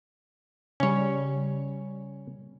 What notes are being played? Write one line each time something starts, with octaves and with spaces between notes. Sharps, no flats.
C#3 G3 C#4 C#5